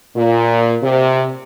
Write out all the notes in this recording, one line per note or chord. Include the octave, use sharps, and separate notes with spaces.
A#2
C3